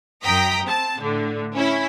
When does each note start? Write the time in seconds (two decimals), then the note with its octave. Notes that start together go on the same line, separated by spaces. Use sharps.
0.24 F#2 G5 A#5 D#6 B6
0.65 C4 A5
1.01 A2 D3
1.55 C#4 E4